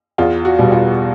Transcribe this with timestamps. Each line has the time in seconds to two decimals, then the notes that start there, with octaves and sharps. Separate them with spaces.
0.18 E2 F4
0.45 F#4
0.59 B2 G3
0.72 F4